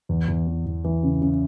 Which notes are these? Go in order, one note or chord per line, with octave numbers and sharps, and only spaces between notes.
E2
E2
E3
E2
E3
C#3
C#3